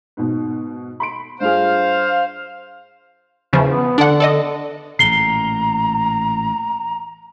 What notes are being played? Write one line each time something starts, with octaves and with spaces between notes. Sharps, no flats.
G#2 B2
B5 C6 D7
G2 F4 G#4 C5 F5
E2 C#3 F3
B3
D3 D4 F#5
A4 D5 D#5
A1 A#2 A#5 C7 G7